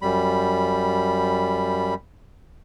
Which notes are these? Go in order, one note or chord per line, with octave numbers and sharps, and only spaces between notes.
F#2 G3 B5